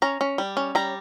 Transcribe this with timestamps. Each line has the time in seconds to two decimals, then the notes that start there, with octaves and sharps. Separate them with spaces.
0.02 C#4 A#5
0.21 C#4
0.38 G3
0.57 C#4
0.75 G3 A#5